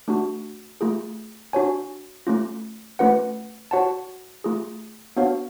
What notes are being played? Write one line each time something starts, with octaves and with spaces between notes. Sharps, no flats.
A3 D4 F#4
A3 F4 G#4
D4 F#4 C#5 G#5
A3 C#4 F4
A3 C#4 F4 B4 F#5
F#4 C#5 F#5 A5
A3 F4 G#4
B3 D4 F#4 C#5 F5